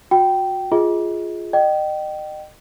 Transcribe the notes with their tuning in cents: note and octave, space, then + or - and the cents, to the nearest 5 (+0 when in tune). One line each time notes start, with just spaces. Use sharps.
F#4 -30 G5 -15
F4 +0 G#4 +0 D#5 +30
D#5 -35 G5 -25